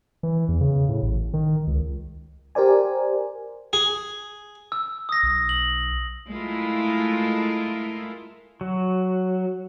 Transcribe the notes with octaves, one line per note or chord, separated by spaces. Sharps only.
E3
E2
C#3
A2
A1
D#3
C#2
G4 A#4 C5 D5 G#5
G#4
E6
D#6 A#6
B1
F#7
G#3 A3 E4 F4 A4 A#4
F#3